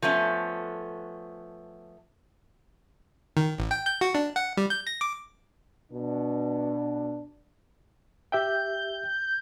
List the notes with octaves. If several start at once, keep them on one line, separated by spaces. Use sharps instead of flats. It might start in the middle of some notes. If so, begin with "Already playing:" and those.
F3 A3 B3 C#4
D#3
A1
G5
G6
F#4
D4
F#5
G3
G6
A#6
D6
B2 D4
G4 E5 G5 G6